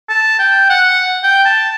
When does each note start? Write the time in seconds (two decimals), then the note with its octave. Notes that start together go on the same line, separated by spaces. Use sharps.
0.09 A5
0.39 G5
0.70 F#5
1.23 G5
1.45 A5